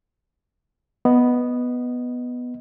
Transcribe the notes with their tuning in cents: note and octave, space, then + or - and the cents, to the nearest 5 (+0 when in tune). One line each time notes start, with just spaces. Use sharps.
B3 +0 D#5 +0